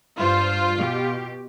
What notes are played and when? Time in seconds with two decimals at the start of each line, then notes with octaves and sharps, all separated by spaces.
0.18 G2 F4 C5
0.78 B2 G4